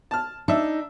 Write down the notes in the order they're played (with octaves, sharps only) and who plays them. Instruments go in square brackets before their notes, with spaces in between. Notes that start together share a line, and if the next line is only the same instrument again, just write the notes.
[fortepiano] A5 F6
[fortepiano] D4 E5 [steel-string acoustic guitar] D#4